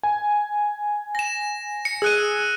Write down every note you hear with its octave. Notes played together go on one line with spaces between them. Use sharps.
G#5
A#6 E7
C#7
G#4 E6 F#6 D#7